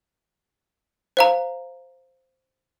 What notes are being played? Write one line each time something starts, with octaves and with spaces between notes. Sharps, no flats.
C5 F5 A#5